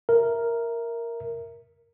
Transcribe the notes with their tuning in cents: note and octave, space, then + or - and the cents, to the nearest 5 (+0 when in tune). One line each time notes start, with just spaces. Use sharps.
A#4 +0 E5 +0